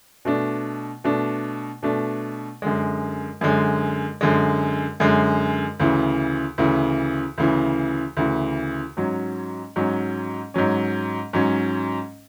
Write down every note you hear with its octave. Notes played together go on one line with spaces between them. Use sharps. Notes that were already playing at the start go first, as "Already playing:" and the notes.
B2 A3 D4
B2 A3 D4
B2 A3 D4
F#2 D3 G#3
F#2 D3 G#3
F#2 D3 G#3
F#2 D3 G#3
D2 C#3 E3
D2 C#3 E3
D2 C#3 E3
D2 C#3 E3
G#2 F#3 C#4
G#2 F#3 C#4
G#2 F#3 C#4
G#2 F#3 C#4